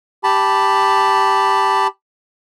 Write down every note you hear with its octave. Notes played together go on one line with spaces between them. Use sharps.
G4 A5 B5